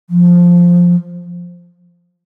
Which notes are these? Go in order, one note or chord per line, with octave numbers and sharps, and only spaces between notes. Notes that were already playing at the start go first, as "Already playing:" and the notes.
F3